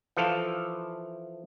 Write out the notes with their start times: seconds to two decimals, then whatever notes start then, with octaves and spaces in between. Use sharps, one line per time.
0.17 E3 F3 A4 F5